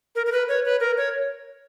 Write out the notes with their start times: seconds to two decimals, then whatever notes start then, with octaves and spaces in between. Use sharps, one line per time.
0.15 A#4
0.26 A#4
0.32 B4
0.48 C#5
0.65 B4
0.80 A#4
0.97 C#5